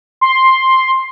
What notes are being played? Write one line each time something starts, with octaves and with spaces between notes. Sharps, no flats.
C6